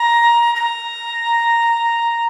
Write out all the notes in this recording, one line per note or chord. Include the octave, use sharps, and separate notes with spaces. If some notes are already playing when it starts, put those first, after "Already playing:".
Already playing: A#5
A#5